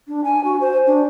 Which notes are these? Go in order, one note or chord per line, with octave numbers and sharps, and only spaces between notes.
D4
G#5
F#4
C5
D4